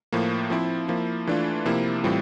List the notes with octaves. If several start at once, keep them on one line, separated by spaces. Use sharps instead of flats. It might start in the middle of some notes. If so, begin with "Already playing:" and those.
A2 F3 A#3
F3 C4 E4
F3 A#3 E4
E3 A3 D4 F4
C3 F3 A#3 E4
A2 E3 G3 C4 F4